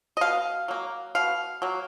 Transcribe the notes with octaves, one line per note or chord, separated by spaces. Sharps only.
D#5
B2 F5
F#3 A#3
B2 F5
F#3 A#3